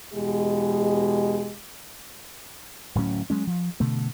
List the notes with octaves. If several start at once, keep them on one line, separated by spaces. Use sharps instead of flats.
E2 B2 G#3 G4
D1 A2 F#3 C#4
F#3 G#3 C#4
F3
G2 B2 D3 A3